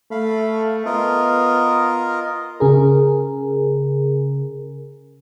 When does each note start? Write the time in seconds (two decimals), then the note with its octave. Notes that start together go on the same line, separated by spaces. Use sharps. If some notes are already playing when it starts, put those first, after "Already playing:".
0.11 A3 F5 B5
0.86 B3 F4 A#4 D#5
2.60 C#3 G#4 A#4